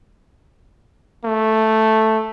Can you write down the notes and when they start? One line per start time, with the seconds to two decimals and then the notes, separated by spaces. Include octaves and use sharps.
1.25 A3